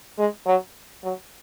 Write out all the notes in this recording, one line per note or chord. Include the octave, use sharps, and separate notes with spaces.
G#3
F#3
F#3